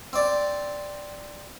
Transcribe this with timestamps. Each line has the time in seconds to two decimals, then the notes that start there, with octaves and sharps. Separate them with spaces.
0.13 C4 D5